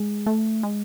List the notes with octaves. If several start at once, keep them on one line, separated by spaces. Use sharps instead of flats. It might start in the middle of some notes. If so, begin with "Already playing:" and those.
Already playing: G#3
A3
G#3